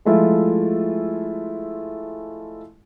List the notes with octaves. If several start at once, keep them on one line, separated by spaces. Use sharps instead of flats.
F3 G#3 A3 E4 F4